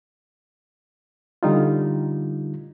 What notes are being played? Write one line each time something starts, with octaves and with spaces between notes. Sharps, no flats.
D3 G3 D#4 F4